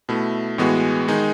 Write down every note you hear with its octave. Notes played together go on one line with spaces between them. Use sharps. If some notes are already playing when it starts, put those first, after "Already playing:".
B2 A3 E4
A2 E3 G#3 B3 F#4
D#3 G#3 D#4